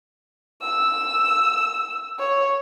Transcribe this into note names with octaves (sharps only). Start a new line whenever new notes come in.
E6
C#5